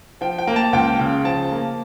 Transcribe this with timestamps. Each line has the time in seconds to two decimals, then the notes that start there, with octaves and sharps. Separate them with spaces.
0.21 F3 G5
0.38 G5
0.47 A#3
0.56 A5
0.73 C#2 G5
0.99 C#3
1.25 F3 A5
1.52 A#3